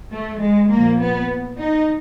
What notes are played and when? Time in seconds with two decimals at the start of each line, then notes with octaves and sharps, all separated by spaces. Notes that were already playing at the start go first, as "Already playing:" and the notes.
0.11 A3
0.40 G#3
0.69 F3 A#3
0.75 A#2
1.00 B3
1.58 D#4